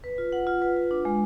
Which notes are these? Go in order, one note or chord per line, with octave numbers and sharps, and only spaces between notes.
B4
F4
F#5
F4
B4
F4
D4
G#3